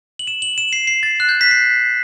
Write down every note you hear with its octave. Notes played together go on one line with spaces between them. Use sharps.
F#7
E7
F#7
E7
C7
C7
A6
F#6
G6
B6
C7